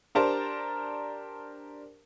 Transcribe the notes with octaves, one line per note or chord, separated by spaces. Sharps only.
D4 G4 A#4 C5 A5 A#5